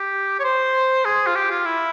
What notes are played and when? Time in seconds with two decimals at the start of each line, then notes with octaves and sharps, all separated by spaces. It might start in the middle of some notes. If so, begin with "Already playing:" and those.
Already playing: G4
0.40 C#5
0.44 C5
1.05 G#4
1.27 F4
1.35 G4
1.51 F4
1.66 E4